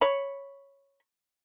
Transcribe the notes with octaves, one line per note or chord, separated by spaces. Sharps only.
C#5 B5